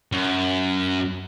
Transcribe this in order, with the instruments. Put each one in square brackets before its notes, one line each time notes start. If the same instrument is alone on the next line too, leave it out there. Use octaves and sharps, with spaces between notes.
[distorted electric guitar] F#2